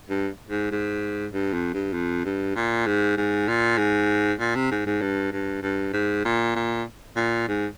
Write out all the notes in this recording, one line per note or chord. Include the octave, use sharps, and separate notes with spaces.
G2
G#2
G#2
G2
F2
G2
F2
G2
A#2
G#2
G#2
A#2
G#2
A#2
C3
G#2
G#2
G2
G2
G2
G#2
A#2
A#2
A#2
G#2